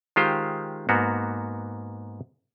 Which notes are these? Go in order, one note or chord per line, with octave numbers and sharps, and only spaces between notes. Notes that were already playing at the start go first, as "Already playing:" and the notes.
D#3 G#3 F4 G4 C5
G#2 A#3 B3 F#4